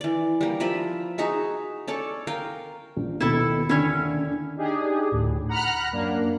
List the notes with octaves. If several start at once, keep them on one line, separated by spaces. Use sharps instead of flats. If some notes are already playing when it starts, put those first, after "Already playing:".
E3 D5
G3 A#3
F3 A#4 E5 B5
D#4 F#4 G#4 E5
C#4 A4 C#5 D5
A#4 F5 G5
A#1
D#2 B2 E4 A4
D#2 D3 C#4 E4
D4
D4 D#4 G4 G#4
D2 A2
F#5 A#5 B5 F6 F#6
F#2 A#3 D4